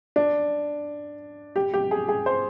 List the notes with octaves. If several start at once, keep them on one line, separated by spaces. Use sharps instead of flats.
D4
G4
G4
G#4
G#4
C5